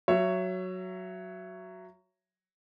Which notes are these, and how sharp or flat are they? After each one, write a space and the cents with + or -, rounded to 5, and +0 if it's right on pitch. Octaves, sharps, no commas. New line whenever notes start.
F#3 +0 C#5 +0 E5 +25